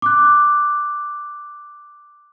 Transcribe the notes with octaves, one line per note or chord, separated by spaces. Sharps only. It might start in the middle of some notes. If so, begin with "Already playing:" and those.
D6 F#6